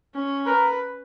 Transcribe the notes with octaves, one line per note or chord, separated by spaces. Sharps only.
C#4
A#4 B4